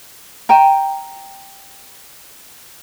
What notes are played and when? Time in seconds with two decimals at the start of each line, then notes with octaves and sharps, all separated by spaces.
0.49 G5 A#5